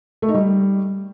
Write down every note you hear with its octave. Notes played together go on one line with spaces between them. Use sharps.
A3
D#4
G3